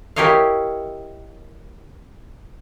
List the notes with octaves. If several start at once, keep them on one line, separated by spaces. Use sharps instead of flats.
E4 G4 A#4 C#5 D#5 F5